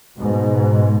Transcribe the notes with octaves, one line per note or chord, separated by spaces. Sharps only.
G#2 B2